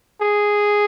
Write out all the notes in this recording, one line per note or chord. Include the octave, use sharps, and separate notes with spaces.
G#4